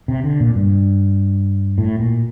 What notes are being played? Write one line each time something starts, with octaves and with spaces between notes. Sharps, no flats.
C3
D3
A#2
G2
A2
A#2